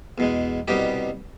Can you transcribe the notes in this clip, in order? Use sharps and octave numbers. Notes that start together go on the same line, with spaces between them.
E2 B2 G#3
C2 B2 G3 B3 D#4 G4